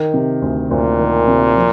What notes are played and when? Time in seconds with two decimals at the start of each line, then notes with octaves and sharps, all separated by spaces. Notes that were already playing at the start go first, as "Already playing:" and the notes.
Already playing: D#3
0.14 C3
0.42 D2
0.71 D2 A#2
0.99 D#3
1.28 C3
1.56 F3